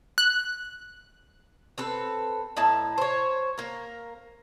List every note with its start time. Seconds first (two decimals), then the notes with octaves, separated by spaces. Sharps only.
0.18 F#6
1.78 C4 A4 B4
2.57 A2 D#4 E4 A5
2.98 C5 C#5
3.58 A#3 A#4